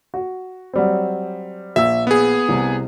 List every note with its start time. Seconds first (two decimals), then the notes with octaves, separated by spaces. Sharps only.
0.14 F#4
0.73 F#3 G3 C4
1.76 A#1 E5 E6
2.07 B3 G#4
2.49 C2 C3